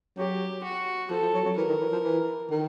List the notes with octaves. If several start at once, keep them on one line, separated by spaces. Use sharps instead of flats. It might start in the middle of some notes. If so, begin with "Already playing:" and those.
F#3 G4
F#4
F3 A4
F3
F#3
F#3
E3 A#4
D#3
E3
F3
E3
D#3